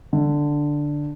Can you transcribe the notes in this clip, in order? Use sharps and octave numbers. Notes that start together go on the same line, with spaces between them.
D3